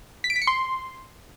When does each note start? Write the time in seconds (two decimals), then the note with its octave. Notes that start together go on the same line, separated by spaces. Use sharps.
0.24 B6
0.30 D7
0.36 B6
0.42 C#7
0.47 C6